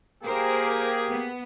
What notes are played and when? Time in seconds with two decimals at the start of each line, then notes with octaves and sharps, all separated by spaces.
0.24 A#3 G4 G#4 A#4 C5
1.08 B3